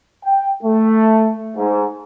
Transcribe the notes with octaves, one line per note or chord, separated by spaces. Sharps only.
G5
A3
G#2